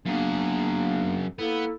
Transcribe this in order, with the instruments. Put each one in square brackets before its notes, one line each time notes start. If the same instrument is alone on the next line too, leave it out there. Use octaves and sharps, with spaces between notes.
[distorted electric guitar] F#2 G#4 [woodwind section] A#3 B3 D4
[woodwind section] A#3 E4 A4 [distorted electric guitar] B3